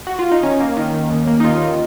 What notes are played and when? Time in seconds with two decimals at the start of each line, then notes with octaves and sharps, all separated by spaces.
0.07 F#4
0.19 F4
0.31 D#4
0.43 D#3 C#4
0.60 A#3
0.77 D#3
0.94 D#3
1.10 D#2
1.27 A#3
1.40 D#4
1.44 D#2 F4
1.61 D#3